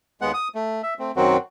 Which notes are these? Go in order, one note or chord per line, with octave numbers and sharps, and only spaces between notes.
D#2 G#3 B3 F#5
D#6
A3
E5
A3 C4
F#2 D#3 F#3 C4 F#4